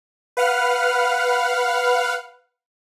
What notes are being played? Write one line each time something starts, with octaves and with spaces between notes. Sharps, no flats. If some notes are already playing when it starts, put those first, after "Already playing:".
B4 F5 F#5 F6